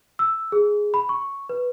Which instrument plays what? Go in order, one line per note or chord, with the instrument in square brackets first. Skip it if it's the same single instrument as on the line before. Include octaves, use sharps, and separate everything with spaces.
[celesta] E6
G#4
B5
C#6
B4